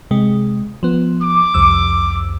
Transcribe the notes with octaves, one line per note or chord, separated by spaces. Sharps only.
C3 G#3
F3 B3
D6
C2 F2 E6